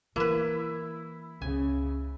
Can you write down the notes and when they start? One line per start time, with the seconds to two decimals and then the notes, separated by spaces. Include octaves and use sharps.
0.16 E3 A#3 D4 E4 B4
1.42 C#2 C#3 G#5